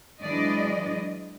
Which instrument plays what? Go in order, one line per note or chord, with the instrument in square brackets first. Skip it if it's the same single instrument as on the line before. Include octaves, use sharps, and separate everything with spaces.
[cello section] E3 F#3 G#3 D4 D5 D#5